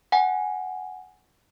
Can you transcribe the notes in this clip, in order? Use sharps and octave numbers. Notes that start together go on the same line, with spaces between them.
F#5 G#5